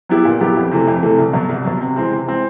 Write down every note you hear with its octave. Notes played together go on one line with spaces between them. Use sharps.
F#3 B3 E4 G4
A#2
F#3 B3 E4 G4
F2
C3 E3 A3
F2
C3 E3 A3
C2
B2 F#3
C2
B2 F#3
C3
E3 G#3 C4
C3
E3 G#3 C4